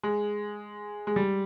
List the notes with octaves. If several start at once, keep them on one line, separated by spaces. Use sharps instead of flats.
G#3
G#3
G3